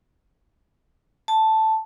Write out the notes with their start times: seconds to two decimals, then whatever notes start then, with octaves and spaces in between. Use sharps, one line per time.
1.28 A5